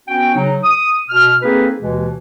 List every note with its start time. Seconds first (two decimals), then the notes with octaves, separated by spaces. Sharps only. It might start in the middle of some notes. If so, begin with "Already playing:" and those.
0.08 B3 C#4 F#4 G5
0.35 C#3 F#3 D#4
0.63 D#6
1.09 B2 F6
1.42 A#3 C4 D#4 G#4 A4 B4
1.80 D#2 B2 E3 G#3